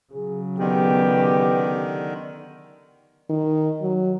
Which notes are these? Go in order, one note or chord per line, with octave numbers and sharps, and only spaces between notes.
C#3 F#3 G#4
D3 D#3 B3 G4
D#3
F#3